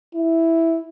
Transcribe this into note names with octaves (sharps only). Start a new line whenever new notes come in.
E4